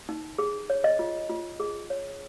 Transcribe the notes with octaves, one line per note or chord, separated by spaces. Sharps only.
D#4
G#4
C#5
D#5
F4
F4
G#4
C#5